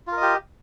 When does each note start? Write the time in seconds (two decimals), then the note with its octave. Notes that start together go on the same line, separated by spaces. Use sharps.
0.07 F4
0.12 A#4
0.17 D#5
0.22 G4